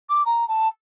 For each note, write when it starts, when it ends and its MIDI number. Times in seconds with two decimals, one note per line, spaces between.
0.09 0.23 86
0.26 0.47 82
0.48 0.68 81